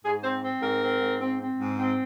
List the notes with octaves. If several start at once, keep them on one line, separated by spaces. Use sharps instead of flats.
G#2 G#4
C4 C5
C4
G#2 A#4
C4
G#2
C4
C4
G#2
C4